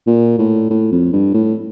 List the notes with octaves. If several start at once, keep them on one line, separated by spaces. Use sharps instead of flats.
A#2
A2
A2
F2
G2
A2